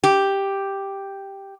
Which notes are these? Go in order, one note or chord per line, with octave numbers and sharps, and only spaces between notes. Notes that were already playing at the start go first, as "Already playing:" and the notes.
G4